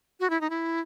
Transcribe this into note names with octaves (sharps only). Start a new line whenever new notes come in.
F#4
E4
D#4
E4